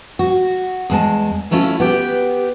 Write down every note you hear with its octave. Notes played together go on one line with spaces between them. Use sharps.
F#4
E2 G#3 A5
F#3 A3 C#4 E4 F4
B3 G4